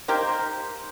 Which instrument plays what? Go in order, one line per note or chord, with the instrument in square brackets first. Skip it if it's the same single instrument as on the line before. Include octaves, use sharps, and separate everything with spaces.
[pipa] D#3 A#3 G4 A#4 [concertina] C5
[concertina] C5